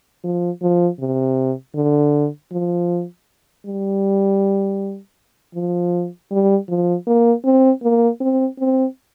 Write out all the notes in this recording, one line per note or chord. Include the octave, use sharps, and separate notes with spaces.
F3
F3
C3
D3
F3
G3
F3
G3
F3
A#3
C4
A#3
C4
C4